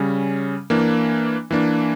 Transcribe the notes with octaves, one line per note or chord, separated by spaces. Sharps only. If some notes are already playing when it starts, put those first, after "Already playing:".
Already playing: C#3 G3 C#4
E3 A#3 D4
E3 A#3 D4